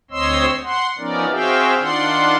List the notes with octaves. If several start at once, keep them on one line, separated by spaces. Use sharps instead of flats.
D2 C4 C#5 D#5 C6 E6
F#5 C6
F3 B3 C#4 D#4 A#4 D5
C4 F#4 G#4 E5 F5 G5
D#3 D4 F4 D5 F#5 C6